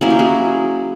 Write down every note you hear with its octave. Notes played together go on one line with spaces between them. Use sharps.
F#3 A#3 C#4 E4 G#4
G4
F#4 G#4